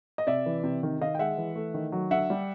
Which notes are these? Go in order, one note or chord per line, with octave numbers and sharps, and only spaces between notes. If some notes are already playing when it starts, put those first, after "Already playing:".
D#5
C3 D5 E5
E3
C3
D#3
D#3 D#5 F5
G5
G#3 E5 F#5
E3
A3
D#3
F#3
D3 E5 F#5
G3